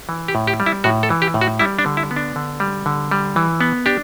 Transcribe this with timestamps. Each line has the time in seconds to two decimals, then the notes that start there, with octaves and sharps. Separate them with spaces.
0.09 E3
0.28 G4
0.35 A2
0.47 G4
0.60 G3
0.66 E4
0.84 A2 F#4
1.03 A4
1.10 E3
1.22 G4
1.34 A2
1.41 F#4
1.59 G3 E4
1.79 D4
1.86 D3
1.97 E4
2.11 B3
2.16 D4
2.36 D3
2.60 G3
2.86 D3
3.11 G3
3.36 E3
3.61 B3
3.86 D4 G4